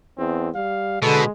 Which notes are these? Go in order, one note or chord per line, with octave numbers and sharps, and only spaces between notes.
E2 C4
G3 F5
B2 D3 G#3 A4